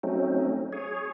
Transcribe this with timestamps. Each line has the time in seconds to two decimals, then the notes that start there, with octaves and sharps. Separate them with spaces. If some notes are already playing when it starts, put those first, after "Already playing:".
0.03 F#3 A3 C4 C#4 D#4
0.72 G#4 C#5